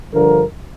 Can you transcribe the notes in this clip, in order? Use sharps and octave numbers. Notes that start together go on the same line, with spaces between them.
G2 D3 F3 A#4